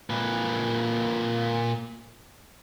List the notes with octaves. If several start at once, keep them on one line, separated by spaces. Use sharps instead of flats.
A#2 B4